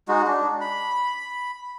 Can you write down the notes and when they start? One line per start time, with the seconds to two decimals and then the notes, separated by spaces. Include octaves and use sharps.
0.08 G#3 D#4 F#4
0.27 D4
0.61 B5